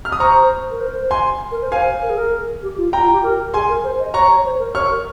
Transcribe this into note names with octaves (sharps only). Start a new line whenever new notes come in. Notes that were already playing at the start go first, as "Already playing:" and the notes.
F6
D#6
C5 A#5 C#6
A#4
C5
G#5 C6
A#4
C5
C5 F5 G#5
A#4
G#4
A#4
G4
F4
G5 A#5
F4
G4
A#4
G#4 G#5 C6
A#4
C5
D#5
C#5 A#5 C#6
C#5
C5
A#4
C#5 C#6 F6
A#4